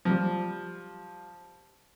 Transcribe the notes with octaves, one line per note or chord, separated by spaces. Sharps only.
F3 G3